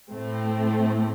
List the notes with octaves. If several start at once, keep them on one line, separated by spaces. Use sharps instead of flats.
A2 A3 C4